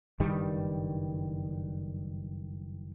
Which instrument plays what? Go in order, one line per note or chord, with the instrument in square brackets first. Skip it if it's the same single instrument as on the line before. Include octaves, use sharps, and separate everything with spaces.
[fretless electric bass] F#1 G2 D#3 G3